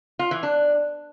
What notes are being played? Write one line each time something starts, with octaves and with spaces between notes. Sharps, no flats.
F4
E3
D4